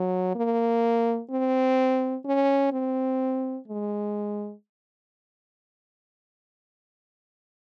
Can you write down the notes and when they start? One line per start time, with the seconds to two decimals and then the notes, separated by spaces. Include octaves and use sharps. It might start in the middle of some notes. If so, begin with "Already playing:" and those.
Already playing: F#3
0.35 A#3
1.31 C4
2.25 C#4
2.73 C4
3.68 G#3